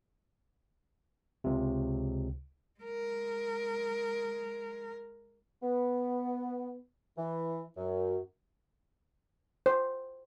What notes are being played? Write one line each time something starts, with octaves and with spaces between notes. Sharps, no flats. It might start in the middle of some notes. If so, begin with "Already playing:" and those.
C#2 C3
G#3 A#4
B3
E3
F#2
C5